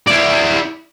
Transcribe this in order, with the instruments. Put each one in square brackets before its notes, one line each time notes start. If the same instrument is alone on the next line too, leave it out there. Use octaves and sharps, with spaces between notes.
[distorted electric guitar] E4 D5